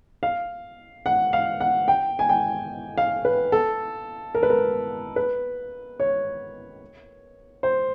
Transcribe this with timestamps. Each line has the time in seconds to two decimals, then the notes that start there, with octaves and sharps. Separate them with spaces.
0.23 F5
1.06 F#5
1.33 F5
1.60 F#5
1.88 G5
2.19 G#5
2.29 G5
2.98 F5
3.25 B4
3.52 A4
4.35 A#4
4.43 B4
4.50 A#4
5.16 B4
6.00 C#5
7.63 C5